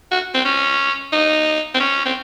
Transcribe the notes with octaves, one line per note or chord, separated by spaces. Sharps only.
F#4
C4
C#4
D#4
C4
C#4
C4